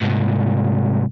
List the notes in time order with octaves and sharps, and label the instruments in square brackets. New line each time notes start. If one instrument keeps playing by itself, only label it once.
[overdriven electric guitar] C2 G#2